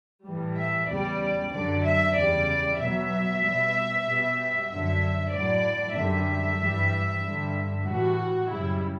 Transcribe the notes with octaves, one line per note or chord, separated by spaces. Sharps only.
A2 E3 G3
E5
E2 C#3 G3 D5
F#2 D3 F#3 D5
E5
E2 C#3 G3 D5
B2 F#3 E5
B2 G3
B2 G3
F#2 D3 F#3 E5
A2 F#3 D5
F#2 D3 G3 E5
G2 E3 G3
G2 D3 G3
A2 E3 G3 F#4
F#2 C#3 G3 E4